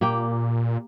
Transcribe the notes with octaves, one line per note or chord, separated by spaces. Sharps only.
A#2 A#3 G4 G5